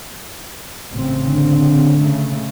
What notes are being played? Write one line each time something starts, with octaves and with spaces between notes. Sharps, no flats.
A1 C#3 C4
D3
C#3 A3